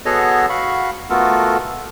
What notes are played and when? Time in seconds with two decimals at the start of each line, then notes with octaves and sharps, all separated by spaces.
0.05 B3 F#4 G#4 A4 C#5 D#5
0.49 F#4 F5 B5 C#6
1.10 A3 B3 F4 F#4 A4 A#4